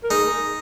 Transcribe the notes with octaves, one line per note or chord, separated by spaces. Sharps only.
A#4
D#4 G#4